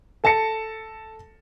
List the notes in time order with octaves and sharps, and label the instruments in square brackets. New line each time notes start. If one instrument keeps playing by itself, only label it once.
[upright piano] A4 A5 A#6 C#7